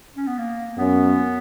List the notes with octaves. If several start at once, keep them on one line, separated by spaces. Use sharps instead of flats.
C#4
B3
A#3
F#2 B3